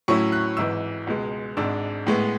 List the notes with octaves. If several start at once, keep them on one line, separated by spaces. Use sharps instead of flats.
A2 F#3 C#4 E4 C#6
F#6
G#1 G#2 E3 E6
C#2 B2 G#3
G#1 G#2 G#3 D4 E6
A2 G#3 B3